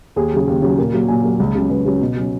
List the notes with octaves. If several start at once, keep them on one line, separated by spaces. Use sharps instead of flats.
D#2 G#4
C#3 F#3
D#2
C#3 F#3
A#2 A#4
F#3 A#3
A#2 G#5
F#3 A#3
C#2
C#3 F#3 C#4
C#2 B4
C#3 F#3 C#4
B2
F#3 C#4